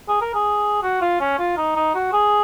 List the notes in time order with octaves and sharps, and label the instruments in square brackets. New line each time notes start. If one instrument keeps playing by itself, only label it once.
[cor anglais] G#4
A#4
G#4
F#4
F4
C#4
F4
D#4
D#4
F#4
G#4